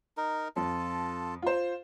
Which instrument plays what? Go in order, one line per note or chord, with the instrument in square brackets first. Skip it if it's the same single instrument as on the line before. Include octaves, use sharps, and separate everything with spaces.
[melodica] D#4 A#4
[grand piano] F2 [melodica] F4 A4 A5
[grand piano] F4 C5